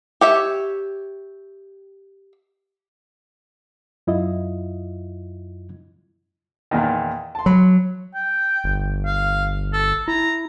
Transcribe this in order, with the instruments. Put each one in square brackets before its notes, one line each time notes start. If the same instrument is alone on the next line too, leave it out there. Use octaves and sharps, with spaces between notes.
[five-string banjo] G4 C#5 E5
[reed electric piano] F#2 E4 F4 D#5
[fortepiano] E2 A#2 D#3
A5 C6
[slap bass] F#3 [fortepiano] B5
[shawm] G5
[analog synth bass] G1
[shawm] F5
A4
[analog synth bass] E4 [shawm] A#5